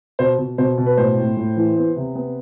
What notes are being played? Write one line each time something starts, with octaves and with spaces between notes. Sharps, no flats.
B2 C5
B2
B2 C5
B2
B4
A2 C5
A2
A2
E3
B3
C3
B3